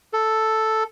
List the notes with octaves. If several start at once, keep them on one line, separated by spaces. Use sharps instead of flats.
A4